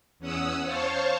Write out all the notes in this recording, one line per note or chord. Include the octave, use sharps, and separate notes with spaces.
E2 C#4 F#5 D#6 E6
C5 C#5 F5 A5 C#6